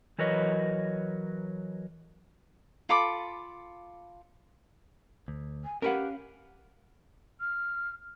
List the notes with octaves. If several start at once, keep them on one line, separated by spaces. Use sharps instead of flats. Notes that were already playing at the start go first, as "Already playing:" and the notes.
E3 F#3 A#4 B4 C#5 D#5
F4 A4 B5 D6
D2
G#5
C#4 G4 A#4 B4 F5 F#5
F6